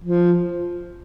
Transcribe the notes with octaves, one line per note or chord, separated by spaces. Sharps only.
F3